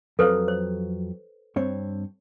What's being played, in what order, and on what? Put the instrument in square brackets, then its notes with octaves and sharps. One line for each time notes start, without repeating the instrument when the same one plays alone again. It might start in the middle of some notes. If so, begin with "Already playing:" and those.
[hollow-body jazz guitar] F2 F#3 F5 [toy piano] A4 B4 C5
[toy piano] C5
[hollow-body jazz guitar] G2 C4 C#5